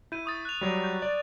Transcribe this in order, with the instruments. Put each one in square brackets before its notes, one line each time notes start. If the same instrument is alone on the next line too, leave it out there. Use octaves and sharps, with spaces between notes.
[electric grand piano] E4 [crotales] G6 D#7
[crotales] C#6 D#6 A6
F#6 F7
[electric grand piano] F#3 G3
[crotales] G6
[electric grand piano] D5